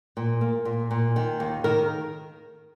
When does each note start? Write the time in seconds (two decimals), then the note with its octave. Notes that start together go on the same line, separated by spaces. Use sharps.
0.17 A#2
0.41 A#3
0.65 A#2
0.91 A#2
1.16 D#3
1.40 D#2
1.64 D#3 A#4